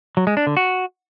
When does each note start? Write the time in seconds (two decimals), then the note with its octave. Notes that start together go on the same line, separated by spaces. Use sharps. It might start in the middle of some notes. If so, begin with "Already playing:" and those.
0.17 F#3
0.27 G#3
0.37 D4
0.47 D3
0.57 F#4